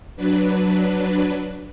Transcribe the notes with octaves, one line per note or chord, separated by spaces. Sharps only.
F#3 D4 B4